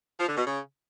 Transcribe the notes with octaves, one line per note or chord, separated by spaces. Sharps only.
F3
D3
B2
C#3